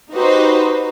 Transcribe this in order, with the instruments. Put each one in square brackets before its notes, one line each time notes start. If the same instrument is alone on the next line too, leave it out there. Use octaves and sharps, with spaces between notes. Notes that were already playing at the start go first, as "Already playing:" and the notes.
[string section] D#4 F#4 G4 B4 C5